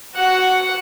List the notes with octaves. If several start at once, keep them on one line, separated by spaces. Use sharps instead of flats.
F#4 F#5